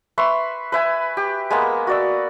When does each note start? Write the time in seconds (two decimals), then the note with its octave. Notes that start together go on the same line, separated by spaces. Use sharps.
0.18 B4 E5 C6 C#6
0.72 B4 E5 G#5
1.17 G4
1.50 G#3 A#3 B3
1.87 F#4 D5 E6